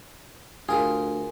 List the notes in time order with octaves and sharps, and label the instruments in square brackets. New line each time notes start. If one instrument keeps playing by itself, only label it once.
[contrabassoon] D2 [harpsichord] F4 A#4 [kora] G#4